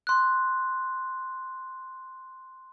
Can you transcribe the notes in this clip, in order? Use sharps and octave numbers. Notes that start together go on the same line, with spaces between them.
C6 F#6